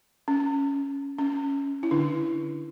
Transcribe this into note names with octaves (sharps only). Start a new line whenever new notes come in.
C#4
C#4
E4
D3 D4